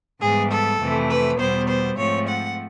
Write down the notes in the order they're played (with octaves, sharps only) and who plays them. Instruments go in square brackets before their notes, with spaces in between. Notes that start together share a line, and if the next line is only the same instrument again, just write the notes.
[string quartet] G#2 E3 G3 B3 G#4
A4
F2 C3 E3 A3
B4
E2 B2 G3 B3 C5
C5
G#2 F3 A3 C4 C#5
F#5